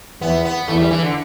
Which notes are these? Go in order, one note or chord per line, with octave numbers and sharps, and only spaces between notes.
E2 E3 B3
B3
E2 E3 A3
G3
E3
D3